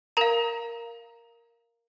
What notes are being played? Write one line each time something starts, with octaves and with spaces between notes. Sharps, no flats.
A#4 F5 A#5